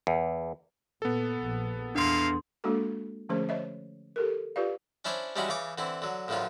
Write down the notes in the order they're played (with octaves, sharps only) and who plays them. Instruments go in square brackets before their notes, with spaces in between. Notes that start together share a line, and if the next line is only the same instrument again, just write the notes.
[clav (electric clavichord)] E2
[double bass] A#2 [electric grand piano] B3 A4
[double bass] A#1
[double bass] E2 [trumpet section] A3 A#3 F5 [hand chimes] D4 C6
[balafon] G#3 A#3 D4 F#4 A4
D3 F3 A3 C#4 G#4 C5
C5 C#5 D#5 E5
G4 A4 A#4
F4 G4 B4 D5 F5
[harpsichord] C#4 D4 E4 C5 C#5
G3 G#3 C#4 D4 E4 F#4
C#3 E3 C#5 D6
D3 E3 C4 E4
D3 F#3
A#1 A2 D3 F3 F#3 F4